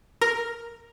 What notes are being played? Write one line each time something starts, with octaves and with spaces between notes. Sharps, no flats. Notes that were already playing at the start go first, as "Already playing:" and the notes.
A#4